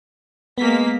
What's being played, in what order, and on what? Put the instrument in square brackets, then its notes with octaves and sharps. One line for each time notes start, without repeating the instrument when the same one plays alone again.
[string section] G#3 A#3 B6 [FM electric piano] B3